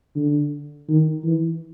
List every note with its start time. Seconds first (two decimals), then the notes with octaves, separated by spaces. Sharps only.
0.16 D3
0.89 D#3
1.24 E3